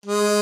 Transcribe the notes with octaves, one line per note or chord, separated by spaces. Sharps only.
G#3